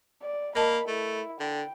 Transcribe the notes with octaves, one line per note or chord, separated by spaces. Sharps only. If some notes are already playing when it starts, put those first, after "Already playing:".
D5
A#3 A#4 D#5 A5 B5
A3 E4
D3 G5